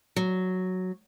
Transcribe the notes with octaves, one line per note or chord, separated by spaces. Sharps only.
F#3